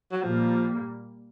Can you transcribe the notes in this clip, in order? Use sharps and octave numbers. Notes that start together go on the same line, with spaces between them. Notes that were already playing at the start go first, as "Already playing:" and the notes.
F#3
A#2 F3 G3 A#3